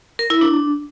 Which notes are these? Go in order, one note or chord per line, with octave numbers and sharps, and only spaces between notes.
A#4
E4
D4